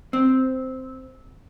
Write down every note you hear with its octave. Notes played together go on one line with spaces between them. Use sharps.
C4